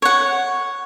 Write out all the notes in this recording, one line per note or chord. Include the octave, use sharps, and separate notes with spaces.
C#5 F#5